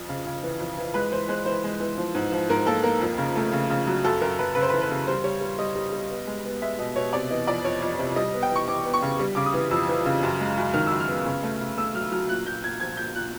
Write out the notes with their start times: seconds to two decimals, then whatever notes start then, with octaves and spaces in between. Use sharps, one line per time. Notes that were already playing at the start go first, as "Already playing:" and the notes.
Already playing: F2
0.09 C#3
0.26 C#3
0.43 E3
0.60 F2
0.78 E3
0.94 G#3 B4
1.11 E3 C5
1.28 G#3 C5
1.46 E3 C5
1.64 G#3
1.80 E3
1.98 F3
2.14 G#2
2.32 F3
2.49 G#2 A#4
2.66 A#3 A4
2.83 A#3 A#4
3.01 F2
3.18 C#3
3.36 A3
3.53 C#3
3.70 C#3
3.87 F#3
4.04 F#2 A4
4.21 F#2 A#4
4.38 F#2 B4
4.55 C#3 B4
4.62 C5
4.69 B4
4.73 E3
4.81 B4
4.90 C#3
5.07 G3 C5
5.24 G3 C#5
5.41 G3
5.58 G3 D#5
5.76 G3
5.92 G3
6.10 B3
6.27 G#3
6.45 B3
6.61 G#3 E5
6.78 B2 D#5
6.96 B2 C#5
7.13 C3 D5
7.31 E3 D#5
7.47 F2 D5
7.64 F2 C#5
7.82 F2
7.99 C3
8.16 G3 D#5
8.34 B3
8.42 G5
8.51 E3 C#6
8.68 E3 D6
8.85 B3
8.94 C#6
9.02 C#3
9.20 G3
9.35 C#3 D6
9.46 D#6
9.54 E3
9.71 F2 E6
9.89 E3
10.06 C#3
10.23 F#2
10.40 G#3
10.57 F#2
10.74 D#3 F6
10.87 F#2 E6
11.00 F6
11.08 B3
11.25 C#3
11.43 A3
11.61 C#3
11.78 A3 E6
11.94 F#3 F6
12.12 F#3 F6
12.29 A#2 F#6
12.46 A#2 G6
12.63 A#2 G#6
12.80 F3 G#6
12.97 A#2 G6
13.14 A#2 F#6